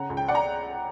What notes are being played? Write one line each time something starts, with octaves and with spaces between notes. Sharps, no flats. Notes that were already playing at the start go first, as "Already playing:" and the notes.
Already playing: C#3 F#5 A#5
C#2
G5
D5 F#5
A#5